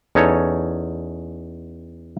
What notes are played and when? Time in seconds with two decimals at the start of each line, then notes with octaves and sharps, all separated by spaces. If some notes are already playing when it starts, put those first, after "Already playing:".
0.15 E2 C#4 D#4 A4 C#5